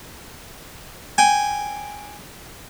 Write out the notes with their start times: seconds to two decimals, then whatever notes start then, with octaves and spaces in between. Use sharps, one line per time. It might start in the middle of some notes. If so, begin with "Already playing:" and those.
1.18 G5 G#5